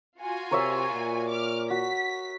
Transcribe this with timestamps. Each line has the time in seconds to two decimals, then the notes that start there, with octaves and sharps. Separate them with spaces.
0.19 F4 F#4 G#5
0.51 C3 A#4 C#5 E5
0.93 A#2
1.28 D6 F6
1.70 F#4 B6